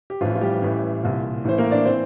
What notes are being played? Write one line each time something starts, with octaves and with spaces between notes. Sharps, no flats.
G4
A1 A2 E3 F3 F4
F4
G3 G4
A1 A2 E3
C2 A#2
A1 A2 E3 C5
A#3 A#4
D4 D5
E3 C4 C5